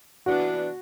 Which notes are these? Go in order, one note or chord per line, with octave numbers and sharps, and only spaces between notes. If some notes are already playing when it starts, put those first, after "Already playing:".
E3 B3 D4 F#4